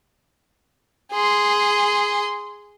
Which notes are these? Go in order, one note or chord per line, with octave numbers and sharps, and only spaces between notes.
G#4 C6